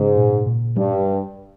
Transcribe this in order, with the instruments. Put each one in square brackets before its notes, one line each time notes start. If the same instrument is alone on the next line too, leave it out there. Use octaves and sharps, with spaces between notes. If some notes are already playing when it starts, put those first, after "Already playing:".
Already playing: [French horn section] G#2 [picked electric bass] C#3
[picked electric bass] A#2
A#2
[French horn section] G2 [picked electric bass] G3